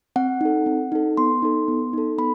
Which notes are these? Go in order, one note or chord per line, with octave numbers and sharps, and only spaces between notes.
C4 F#5
D#4 A4
C4
D#4 A4
B3 C6
D#4 A4
B3
D#4 A4
B3 B5